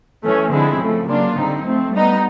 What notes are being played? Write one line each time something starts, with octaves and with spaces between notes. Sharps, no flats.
E3 A3 C#4
D3 F3 G#3 C4 E4
C#3 F3 A3
C#3 F#3 A#3 D4 F4
D3 G3 C4 D#4
F3 A3 C4
G3 B3 D#4